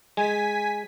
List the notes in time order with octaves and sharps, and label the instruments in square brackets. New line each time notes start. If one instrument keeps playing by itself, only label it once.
[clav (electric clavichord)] G#3 [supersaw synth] G#5 B6